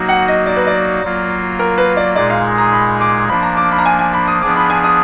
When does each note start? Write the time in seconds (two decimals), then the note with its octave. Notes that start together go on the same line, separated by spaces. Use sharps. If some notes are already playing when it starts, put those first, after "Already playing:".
Already playing: F#3 A#3 D#4 F#4
0.09 F#5
0.28 D#5
0.46 D5
0.56 B4
0.67 D5
1.04 F#3 A#3 F4
1.59 A#4
1.78 B4
1.97 D5
2.16 A#2 G#3 D#4 G#4 D5
2.30 F5
2.58 A#5
2.73 B5
3.01 D6
3.29 F3 A#3 D4 B5
3.43 A#5
3.57 D6
3.72 B5
3.78 A#5
3.85 G#5
3.99 G#5
4.13 B5
4.28 D#6
4.41 F3 B3 D4 G#4 D6
4.56 B5
4.70 G#5
4.84 D#6